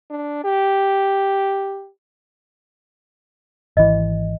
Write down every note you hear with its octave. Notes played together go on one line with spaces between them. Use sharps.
D4
G4
G#1 E3 D#5